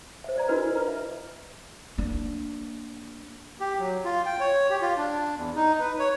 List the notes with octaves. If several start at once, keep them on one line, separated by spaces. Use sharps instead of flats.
C5 E5
C5 D5 A#5
D4 E4 F#4 A#4 B4 D#5
F4 B4 A#5
E5
A#3 D4
G4
F#3
F4
G5
C#5
G4
F4
D4
E2
D#4
B4
C#5